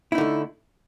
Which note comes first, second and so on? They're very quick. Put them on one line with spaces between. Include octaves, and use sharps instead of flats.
E4 D#4 D3 A3